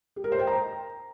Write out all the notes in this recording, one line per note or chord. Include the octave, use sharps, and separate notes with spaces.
G4
A#4
C5
G5
A#5